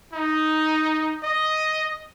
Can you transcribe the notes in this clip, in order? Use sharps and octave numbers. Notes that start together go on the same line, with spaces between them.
D#4
D#5